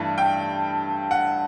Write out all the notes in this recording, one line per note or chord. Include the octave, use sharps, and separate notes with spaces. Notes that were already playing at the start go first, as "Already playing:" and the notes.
Already playing: G2 E3 A3
G5
F#5